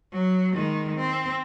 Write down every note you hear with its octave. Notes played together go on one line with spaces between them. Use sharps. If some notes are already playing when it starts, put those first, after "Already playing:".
F#3
D#3 G#3
C4